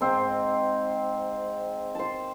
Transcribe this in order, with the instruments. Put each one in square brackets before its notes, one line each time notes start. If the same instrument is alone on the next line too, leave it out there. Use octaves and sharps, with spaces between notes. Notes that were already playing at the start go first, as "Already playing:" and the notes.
[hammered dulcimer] G#2 C4
C5 A5